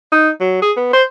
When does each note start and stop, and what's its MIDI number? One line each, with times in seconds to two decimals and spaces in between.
0.12 0.29 63
0.41 0.59 54
0.62 0.71 68
0.77 0.90 59
0.93 1.03 72